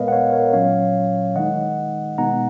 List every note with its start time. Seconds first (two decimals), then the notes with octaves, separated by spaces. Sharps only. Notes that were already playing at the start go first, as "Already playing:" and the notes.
Already playing: A#2 G#3 B3 A#4 B4 C#5 D#5 F5
0.08 F#5
0.12 C#5 F5
0.32 A#4 C#5
0.53 A#2 F#3 C#4 C#5 F5
1.36 D#3 G#3 D#4 D#5 F#5
2.18 B2 G#3 B3 D#4 F#5 A#5